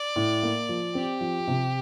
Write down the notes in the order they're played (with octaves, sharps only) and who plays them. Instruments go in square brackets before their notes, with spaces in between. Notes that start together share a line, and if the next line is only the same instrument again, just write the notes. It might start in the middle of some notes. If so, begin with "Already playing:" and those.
Already playing: [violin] D5
[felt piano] A2
A#3
F3
[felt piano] C4 [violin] G4
[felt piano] F3
C3